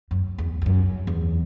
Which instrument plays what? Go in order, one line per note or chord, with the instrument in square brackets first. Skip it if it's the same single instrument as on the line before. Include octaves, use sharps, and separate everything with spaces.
[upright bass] F#2
E2
E2
F#2
E2